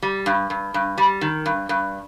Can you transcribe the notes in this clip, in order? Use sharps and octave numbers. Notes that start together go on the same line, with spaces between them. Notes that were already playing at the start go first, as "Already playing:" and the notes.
G3
G2
G2
G2
G3
D#3
G2
G2